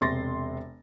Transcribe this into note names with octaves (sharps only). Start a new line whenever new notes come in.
E1 C3 C6 A6 A#6